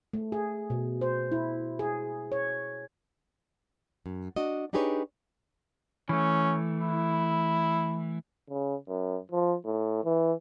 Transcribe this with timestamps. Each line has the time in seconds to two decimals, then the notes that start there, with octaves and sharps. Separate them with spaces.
0.13 A3
0.32 G#4
0.70 B2
1.01 C5
1.32 E4
1.79 G#4
2.32 C#5
4.06 F#2
4.36 D4 F#4 D#5
4.73 D4 D#4 G4 G#4 B4 C#5
6.09 E3 A3 C#4
6.81 E4
8.50 C#3
8.88 F#2
9.32 F3
9.65 A2
10.04 E3